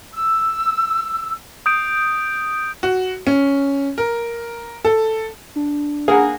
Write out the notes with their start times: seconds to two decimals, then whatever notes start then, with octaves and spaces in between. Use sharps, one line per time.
0.14 E6
1.66 D#6 G6 D7
2.83 F#4
3.27 C#4
3.98 A#4
4.85 A4
5.56 D4
6.08 A#3 G#4 A#4 F#5